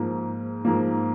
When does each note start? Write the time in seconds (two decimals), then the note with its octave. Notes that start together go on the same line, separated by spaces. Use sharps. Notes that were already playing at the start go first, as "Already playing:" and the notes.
Already playing: G#2 F3 A#3
0.65 G#2 F3 A#3